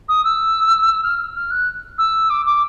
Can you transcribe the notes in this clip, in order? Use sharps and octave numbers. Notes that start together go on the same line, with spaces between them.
D#6
E6
F6
F6
F#6
E6
D6
D6